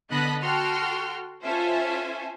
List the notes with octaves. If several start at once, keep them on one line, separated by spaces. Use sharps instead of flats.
D3 B3 D#5 A5 B5 F#6
F#4 A4 G5 C6 F6
C#4 F4 A4 C5 E5 G#5